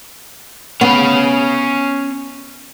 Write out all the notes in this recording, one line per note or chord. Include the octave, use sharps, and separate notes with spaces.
B3 C#4 F5